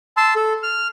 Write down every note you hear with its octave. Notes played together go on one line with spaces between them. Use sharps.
A5 C6 E6
A4
F6